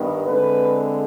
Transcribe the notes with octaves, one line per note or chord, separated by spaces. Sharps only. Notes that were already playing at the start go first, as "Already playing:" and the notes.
Already playing: G2 D#3 B3
D3 G#3 C4 B4